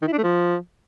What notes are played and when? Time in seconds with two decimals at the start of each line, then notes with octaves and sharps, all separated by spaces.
0.02 D#3
0.07 E4
0.13 D4
0.18 A3
0.23 F3